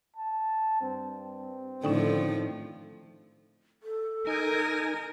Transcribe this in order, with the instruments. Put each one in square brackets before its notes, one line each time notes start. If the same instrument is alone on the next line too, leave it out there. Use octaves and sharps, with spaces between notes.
[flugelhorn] A5
[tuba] G2 [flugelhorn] C4
[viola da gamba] A2 D#3 F3 [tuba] D3 [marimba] C#4 D#4 G5
[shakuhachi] A4
[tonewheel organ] D#4 G#5 [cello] A#4